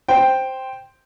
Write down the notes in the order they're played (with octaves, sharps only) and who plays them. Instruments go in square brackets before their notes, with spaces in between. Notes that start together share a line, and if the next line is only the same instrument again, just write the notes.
[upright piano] C5 G5